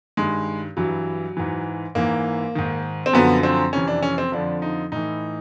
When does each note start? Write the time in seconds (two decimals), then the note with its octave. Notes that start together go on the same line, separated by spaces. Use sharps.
0.17 G2 D#3 G#3
0.77 G2 E3 F#3
1.37 G#2 E3
1.95 G#2 E3 A#3
2.55 G#2 D#3
3.06 C4
3.13 F#2 D3 F3 B3
3.43 C4
3.73 F2 C3 E3 C#4
3.88 D4
4.03 C#4
4.18 C4
4.32 F2 D3 F3 D4
4.62 D#4
4.92 A2 E3 D#4